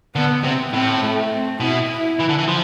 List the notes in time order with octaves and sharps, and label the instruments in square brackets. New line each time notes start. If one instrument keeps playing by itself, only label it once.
[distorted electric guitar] D3 [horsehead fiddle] B3
[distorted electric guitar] C3 [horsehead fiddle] C4
[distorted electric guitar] A2 [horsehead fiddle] C4
[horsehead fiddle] A3
C4
[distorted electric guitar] B2 [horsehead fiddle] E4
[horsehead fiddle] E4
[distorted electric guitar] E3
D3
E3
F3